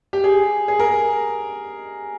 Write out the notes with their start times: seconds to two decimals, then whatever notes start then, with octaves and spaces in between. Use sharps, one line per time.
0.13 G4
0.24 G#4
0.68 G#4
0.80 A#4